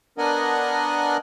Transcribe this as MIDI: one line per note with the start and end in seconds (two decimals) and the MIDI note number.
0.18 1.17 59
0.18 1.17 62
0.18 1.17 70
0.18 1.17 75
0.18 1.17 78
0.18 1.17 80